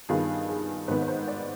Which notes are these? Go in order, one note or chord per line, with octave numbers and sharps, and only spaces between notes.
G2 D#3 B3 F4 G#4
G#4
G#2 D#3 B3 B4
B4
C5
D5